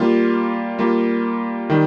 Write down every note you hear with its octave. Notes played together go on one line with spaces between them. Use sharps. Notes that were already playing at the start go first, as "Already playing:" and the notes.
Already playing: G3 A#3 F4
G3 A#3 F4
D#3 G3